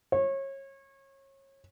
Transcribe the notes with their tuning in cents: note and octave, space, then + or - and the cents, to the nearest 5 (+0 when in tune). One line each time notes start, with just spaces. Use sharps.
C#5 -30